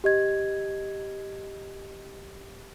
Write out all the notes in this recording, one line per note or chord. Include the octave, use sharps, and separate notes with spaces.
G4 D#5 G#6